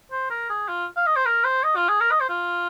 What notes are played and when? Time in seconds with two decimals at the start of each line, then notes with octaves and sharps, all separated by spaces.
0.12 C5
0.30 A#4
0.49 G#4
0.68 F4
0.96 F5
1.06 D#5
1.16 C5
1.25 A#4
1.44 C5
1.63 D#5
1.76 F4
1.89 G#4
2.01 A#4
2.11 D#5
2.20 C5
2.29 F4